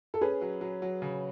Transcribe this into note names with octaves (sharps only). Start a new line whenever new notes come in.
A4
C#4 G#4 B4
F#3
F#3
F#3
C#3